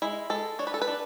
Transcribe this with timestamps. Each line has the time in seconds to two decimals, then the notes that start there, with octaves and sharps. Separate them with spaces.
0.02 G#3 E4
0.30 G#3 A4
0.59 D4 C#5
0.67 B4
0.74 A4
0.82 B4
0.88 D4